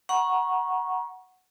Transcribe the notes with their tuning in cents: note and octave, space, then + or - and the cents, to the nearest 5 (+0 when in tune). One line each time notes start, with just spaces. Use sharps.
F#5 +0 A#5 +30 C#6 -10